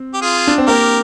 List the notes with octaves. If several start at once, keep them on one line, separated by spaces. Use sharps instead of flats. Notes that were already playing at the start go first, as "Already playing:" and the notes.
Already playing: C4
G4
F4 G#4
D4
C4
A#3 G4 A#4